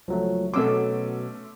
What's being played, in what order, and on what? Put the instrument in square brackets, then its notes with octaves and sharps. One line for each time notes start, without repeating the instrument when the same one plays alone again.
[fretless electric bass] C#2 [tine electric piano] F3 F#3 A3
[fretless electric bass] B2 F#3 [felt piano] A3 C#4 D6 [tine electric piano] C6 E6